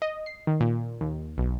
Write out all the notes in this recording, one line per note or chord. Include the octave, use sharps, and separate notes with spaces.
D#5
C7
D#3
A#2
D#2
B1